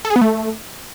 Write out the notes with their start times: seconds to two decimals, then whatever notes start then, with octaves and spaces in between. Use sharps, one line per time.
0.05 A4
0.10 G#4
0.16 B3
0.21 A3